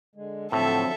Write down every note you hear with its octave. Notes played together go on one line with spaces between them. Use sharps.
D3 G#3
A2 D3 F3 F#3 C4 A4 E5